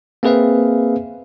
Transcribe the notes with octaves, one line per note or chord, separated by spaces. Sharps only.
A#3 C4 G#4 B4 E5 F5